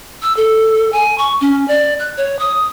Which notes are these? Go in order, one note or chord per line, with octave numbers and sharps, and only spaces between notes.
E6
A4
G#5
C#6
C#4
D5
F#6
C#5
D#6